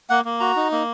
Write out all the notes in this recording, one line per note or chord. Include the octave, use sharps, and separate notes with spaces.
A#3 F#5
A#3
F#4 A#5
D#4
A#3